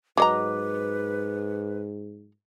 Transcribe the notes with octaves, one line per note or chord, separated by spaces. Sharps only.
G#2 F#3 B4 D#5 A#5 D6